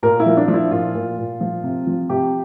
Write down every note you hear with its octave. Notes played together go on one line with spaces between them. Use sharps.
A#2 A#4
E4
F3
D4
F3
E4
A#2 F4
A#2
A#2
F3
C3
F3
C3 G4